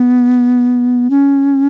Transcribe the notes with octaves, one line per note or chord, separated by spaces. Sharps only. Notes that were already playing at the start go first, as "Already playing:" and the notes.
Already playing: B3
C#4